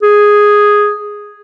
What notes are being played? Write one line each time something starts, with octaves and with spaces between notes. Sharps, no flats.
G#4